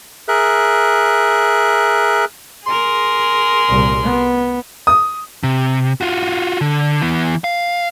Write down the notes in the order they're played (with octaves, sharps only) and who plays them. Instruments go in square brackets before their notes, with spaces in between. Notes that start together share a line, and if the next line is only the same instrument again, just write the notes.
[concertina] G#4 A#4 E5 F#6
[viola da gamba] G#4 A#4 [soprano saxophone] C6
[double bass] C2 A#2
B3
[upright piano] D#6
[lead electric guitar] C3
F4 F#4
D3
E3 B3
F5